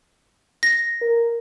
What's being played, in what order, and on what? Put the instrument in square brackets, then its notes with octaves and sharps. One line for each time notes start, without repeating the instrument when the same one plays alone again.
[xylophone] A#6
[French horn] A#4